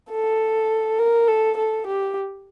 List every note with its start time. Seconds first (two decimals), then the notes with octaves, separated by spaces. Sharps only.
0.11 A4
0.99 A#4
1.28 A4
1.57 A4
1.86 G4